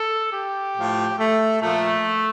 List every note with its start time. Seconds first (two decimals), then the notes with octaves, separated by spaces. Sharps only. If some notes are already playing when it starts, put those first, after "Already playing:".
Already playing: A4
0.33 G4
0.75 A2 F3
1.19 A3
1.61 A#2 F3 A3